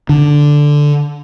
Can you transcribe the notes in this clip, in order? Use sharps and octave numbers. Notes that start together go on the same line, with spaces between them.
D3